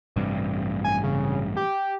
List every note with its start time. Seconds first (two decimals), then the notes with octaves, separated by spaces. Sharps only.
0.16 A1 G2 C3
0.84 G#5
1.03 C#3
1.57 G4